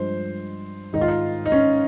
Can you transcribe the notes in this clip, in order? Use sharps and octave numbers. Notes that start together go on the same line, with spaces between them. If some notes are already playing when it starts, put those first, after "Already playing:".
Already playing: G2 F3 G#3 C5
G#2 D#3 G#3 D#4
F4
D#4
D#4
C#4